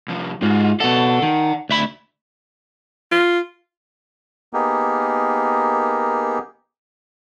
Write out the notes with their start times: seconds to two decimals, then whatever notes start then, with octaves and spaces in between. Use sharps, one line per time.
0.08 C2 F3
0.42 G#2 F4 F#4
0.80 B2 A4 D5 F#5
1.22 D#3
1.69 D2 E5 B5
3.11 F4
4.53 A#3 B3 D#4 G4 G#4 A#4